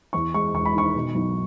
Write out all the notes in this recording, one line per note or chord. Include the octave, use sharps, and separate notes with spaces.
E2 C#6
G#3 C#6
E1 C#6
B5
D#3 C#6
B2
B1